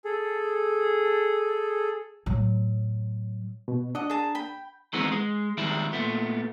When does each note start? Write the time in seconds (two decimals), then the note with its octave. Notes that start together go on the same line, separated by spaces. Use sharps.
0.05 G#4 A4
2.26 A2 F#3
3.68 B2
3.95 D4 D#5 F#5
4.10 G#4 A5 A#5
4.35 G5 B5
4.93 D#3 E3 G#3 B3 C4
5.12 G#3
5.58 D#3 G3 G#3 E4
5.93 A#2 A3 B3